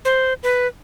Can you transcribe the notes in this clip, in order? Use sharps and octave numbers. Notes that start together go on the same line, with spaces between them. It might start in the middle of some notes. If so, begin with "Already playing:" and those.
C5
B4